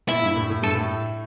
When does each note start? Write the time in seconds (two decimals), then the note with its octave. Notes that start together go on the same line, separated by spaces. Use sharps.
0.08 A#2 E4
0.22 G2
0.36 A2
0.50 A2
0.62 G2 A4
0.75 A2